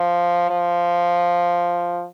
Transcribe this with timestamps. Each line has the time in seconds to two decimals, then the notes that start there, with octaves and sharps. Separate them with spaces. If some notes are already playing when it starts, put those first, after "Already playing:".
Already playing: F3
0.50 F3